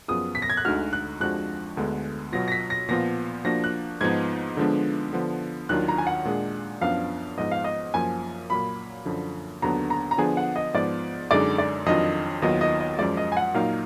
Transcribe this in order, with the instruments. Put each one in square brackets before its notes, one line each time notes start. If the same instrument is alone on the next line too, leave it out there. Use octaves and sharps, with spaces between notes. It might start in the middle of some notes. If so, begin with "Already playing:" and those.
[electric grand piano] F#2 F3 B3 F4 G#4 [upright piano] D#6
[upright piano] B6
A#6
G#6
F#6
[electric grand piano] D2 D3 G#3 D#4 F#4 [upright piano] F6
[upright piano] F#6
[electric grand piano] F2 F3 G#3 D4 F#4 [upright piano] F#6
[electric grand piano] D2 D3 G#3 B3
[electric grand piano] B2 F#3 B3 F4 [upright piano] A#6
[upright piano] A#6
B6
A#6
[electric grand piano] A#2 F3 B3 F4 [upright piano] A#6
[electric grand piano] F3 A#3 D4 F#4 [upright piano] A#6
[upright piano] F#6
[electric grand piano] G#2 F3 B3 D#4 [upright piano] G#6
[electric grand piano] D3 F3 G#3 B3 D4
D3 F3 B3
[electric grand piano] D#2 D#3 F#3 D4 F4 [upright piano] F#6
[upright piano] A#5
G#5
F#5
[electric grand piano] A#2 G#3 D4 G#4
[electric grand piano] F#2 F3 B3 D4 [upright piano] F5
[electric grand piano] G#2 F3 B3 [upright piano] D#5
[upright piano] F5
D#5
[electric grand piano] F#2 F3 A#3 [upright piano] G#5
[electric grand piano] A#2 F#3 A#3 [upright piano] B5
[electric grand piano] F#2 D3 F3
[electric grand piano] D#2 D3 F#3 B3 D4 [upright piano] A#5
[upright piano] A#5
A#5
[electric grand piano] D3 F3 B3 D4 G#4 [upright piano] G#5
[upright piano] F#5
D#5
[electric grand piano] G#2 F3 B3 [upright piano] D5
[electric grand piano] F#2 D3 G#3 D#4 G#4 [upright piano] D5
[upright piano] D5
[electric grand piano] F2 D#3 F#3 D4 F4 [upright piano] D#5
[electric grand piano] D#2 D#3 F#3 B3 F4 [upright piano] D#5
[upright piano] D#5
D#5
[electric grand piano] F#2 F3 G#3 [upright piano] D5
[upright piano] D#5
G#5
F#5
[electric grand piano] A#2 F#3 A#3 D#4 A#4 [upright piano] F5